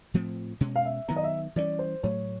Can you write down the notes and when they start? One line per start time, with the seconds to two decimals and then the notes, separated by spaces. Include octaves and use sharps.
0.14 A2 F3 A3 C4
0.61 B2 G#3 C#4
0.76 F5
0.85 E5
1.08 D#3 F#3 B3 A#5
1.16 D#5
1.24 E5
1.56 E3 G3 A#3 C#4 D5
1.79 C5
2.03 A2 F#3 A3 C#5